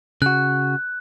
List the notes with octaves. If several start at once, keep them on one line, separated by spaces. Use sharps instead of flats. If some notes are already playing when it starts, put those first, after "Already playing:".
C#3 F#4 F#6